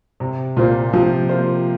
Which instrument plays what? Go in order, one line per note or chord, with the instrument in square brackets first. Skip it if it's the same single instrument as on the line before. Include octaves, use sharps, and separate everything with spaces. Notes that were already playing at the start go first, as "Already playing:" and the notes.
[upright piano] C3
[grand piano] A#2 [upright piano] A#3 F4 C5
[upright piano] C3 [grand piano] F3
[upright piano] A#3 F4 C5